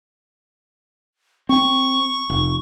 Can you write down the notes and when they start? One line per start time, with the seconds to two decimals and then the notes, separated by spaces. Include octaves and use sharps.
1.49 C4 C#6
2.30 F1